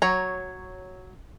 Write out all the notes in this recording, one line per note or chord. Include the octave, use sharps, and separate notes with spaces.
F#3 C#5 A#5